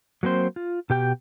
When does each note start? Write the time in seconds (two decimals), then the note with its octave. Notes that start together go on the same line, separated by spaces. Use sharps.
0.23 F#3 A#3 C4 C5
0.56 F4
0.90 B2 G4 G5